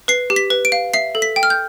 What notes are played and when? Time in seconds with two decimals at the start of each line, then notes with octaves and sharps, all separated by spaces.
0.08 B4 C7
0.30 G4
0.36 B6
0.50 B4
0.65 D7
0.72 F5
0.94 E5 C7
1.15 A4
1.22 B6
1.36 G5
1.43 F6
1.50 G6